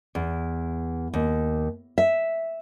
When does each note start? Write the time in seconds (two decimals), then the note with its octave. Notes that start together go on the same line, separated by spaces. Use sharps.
0.15 E2
1.14 D#2
1.98 E5